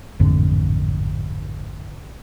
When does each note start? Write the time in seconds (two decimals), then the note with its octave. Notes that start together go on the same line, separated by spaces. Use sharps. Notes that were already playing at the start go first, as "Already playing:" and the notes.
0.19 A1 F2 G#2 D3